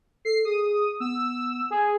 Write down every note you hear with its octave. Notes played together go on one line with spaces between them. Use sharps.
A4 C7
G#4 D#6
B3 E6
G#4